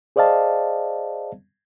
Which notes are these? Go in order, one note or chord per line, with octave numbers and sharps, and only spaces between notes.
G#4 C5 D5 D#5 F5 A5